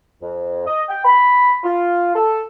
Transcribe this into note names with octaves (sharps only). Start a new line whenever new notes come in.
F2
D#5
G5
B5
F4
A4